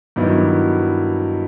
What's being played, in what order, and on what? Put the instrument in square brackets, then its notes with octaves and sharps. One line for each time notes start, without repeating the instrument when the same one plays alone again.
[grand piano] G2 D#3 F#3 B3 E4